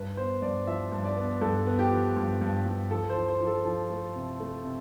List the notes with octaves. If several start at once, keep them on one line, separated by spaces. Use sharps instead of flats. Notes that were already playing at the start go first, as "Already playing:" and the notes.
Already playing: G2 B4
B3 C5
G2 D5
F3 E5
G2
D5
B3
G2 A4
B3
G4
F3
G2
G2
G2
F3 A4
C5
F3
C5
F3
A4
F3
A3
C3
A3
C3